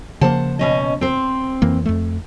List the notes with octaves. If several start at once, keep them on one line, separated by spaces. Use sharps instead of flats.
C#3 F3 A#3 C5 F#5 A5
B2 C#4 D#5
C4 C5
F2 E3 A#3
F2 A3